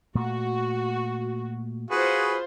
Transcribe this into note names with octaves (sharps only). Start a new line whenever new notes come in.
A#2 A3 F#4
F4 F#4 G#4 B4 C5